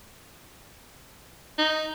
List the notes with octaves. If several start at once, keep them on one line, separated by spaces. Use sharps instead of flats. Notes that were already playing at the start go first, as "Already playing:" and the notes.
D#4